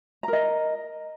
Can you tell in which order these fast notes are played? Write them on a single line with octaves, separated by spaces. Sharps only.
A#5 A#4 D#5